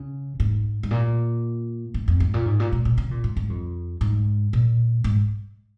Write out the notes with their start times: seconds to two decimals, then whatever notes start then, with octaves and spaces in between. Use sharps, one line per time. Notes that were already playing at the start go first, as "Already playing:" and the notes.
Already playing: C#3
0.40 G#2
0.83 G#2
0.91 A#2
1.94 G#2
2.08 F2
2.20 G#2
2.34 A#2
2.46 G#2
2.60 A#2
2.72 A#2
2.85 A#2
2.98 C#3
3.11 A#2
3.24 G#2
3.37 G#2
3.49 F2
4.01 G#2
4.53 A#2
5.04 G#2